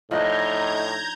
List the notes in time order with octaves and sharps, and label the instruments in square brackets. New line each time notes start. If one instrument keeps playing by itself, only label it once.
[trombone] A2 [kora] F3 D4 D#4 [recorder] D#5 [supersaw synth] A#5 G6 G#6